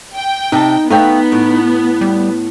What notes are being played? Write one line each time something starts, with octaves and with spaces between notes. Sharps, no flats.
G5
C3 D#4 A5
A3 B3 D#4 F5 G5
A2
G3